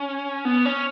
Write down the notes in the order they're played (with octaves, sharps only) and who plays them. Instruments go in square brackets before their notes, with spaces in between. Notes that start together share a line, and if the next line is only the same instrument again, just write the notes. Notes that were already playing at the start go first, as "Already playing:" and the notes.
Already playing: [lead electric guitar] C#4
B3
C#4